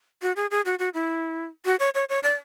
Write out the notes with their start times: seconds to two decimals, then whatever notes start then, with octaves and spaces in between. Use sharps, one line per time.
0.22 F#4
0.36 G#4
0.51 G#4
0.65 F#4
0.79 F#4
0.94 E4
1.66 F#4
1.80 C#5
1.95 C#5
2.09 C#5
2.23 D5